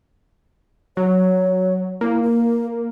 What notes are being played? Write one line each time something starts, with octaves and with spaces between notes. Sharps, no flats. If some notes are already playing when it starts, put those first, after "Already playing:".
F#3 C#5
A#3 E4
A#4